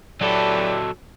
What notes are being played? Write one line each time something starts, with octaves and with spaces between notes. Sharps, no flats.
F#3 E4 G4 A4 B4 D5